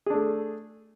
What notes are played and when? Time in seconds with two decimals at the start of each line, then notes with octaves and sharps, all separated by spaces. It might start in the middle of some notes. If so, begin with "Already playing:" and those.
0.06 G#4
0.10 D4
0.14 A3